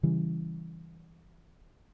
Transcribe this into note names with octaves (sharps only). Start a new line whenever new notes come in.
C#3 E3 G3